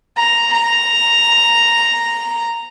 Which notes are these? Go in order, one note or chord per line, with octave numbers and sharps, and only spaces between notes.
A#5
A#5